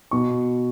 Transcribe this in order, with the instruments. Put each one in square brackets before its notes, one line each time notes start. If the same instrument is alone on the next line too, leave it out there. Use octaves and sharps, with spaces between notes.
[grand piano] B2 C#6